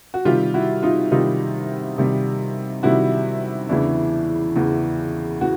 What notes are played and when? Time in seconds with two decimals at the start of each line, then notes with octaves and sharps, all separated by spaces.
0.14 F#4
0.25 C3 D#3 G3 F4 G4
0.54 E4 F#4
0.83 D#4 F4
1.11 C3 D#3 G3 D#4 F4
1.98 C3 D#3 G3
2.83 C3 D#3 G3 E4 F#4
3.69 E2 C#3 E3 D4 E4
4.56 E2 C#3 E3
5.41 E3 F#4